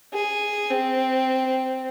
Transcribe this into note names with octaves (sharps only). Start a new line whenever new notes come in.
G#4
C4